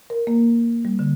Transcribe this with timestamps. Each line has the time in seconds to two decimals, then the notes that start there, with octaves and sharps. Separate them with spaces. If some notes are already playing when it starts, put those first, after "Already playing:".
0.10 A#4
0.27 A#3
0.85 G3
0.99 D3